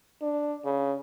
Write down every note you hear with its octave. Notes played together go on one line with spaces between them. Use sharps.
D4
C#3